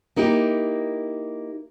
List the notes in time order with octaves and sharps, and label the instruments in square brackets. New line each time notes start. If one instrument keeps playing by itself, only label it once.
[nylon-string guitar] A#3 D#4 E4 G4